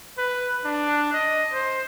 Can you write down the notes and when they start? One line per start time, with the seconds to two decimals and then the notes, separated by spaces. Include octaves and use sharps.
0.18 B4
0.65 D4
1.13 D#5
1.52 C5